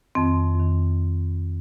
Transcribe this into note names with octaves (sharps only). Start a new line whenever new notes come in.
F2 D#3 C4
F2 D#3